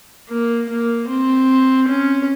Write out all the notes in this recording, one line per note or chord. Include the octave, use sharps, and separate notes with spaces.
A#3
A#3
C4
C#4